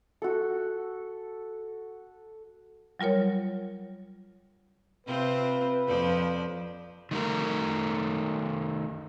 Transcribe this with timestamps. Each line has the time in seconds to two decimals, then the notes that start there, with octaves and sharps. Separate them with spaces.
0.22 F#4 A4
2.99 F#3 G3 F4 A#4 C#5
5.07 C3 C4 F4 B4
5.87 F2 F3 D5
7.11 D#3 A3 A#4